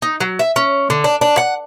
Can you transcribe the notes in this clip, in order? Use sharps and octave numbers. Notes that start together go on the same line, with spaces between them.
D#4
F#3
E5
C#4
D3
D4
D4
F#5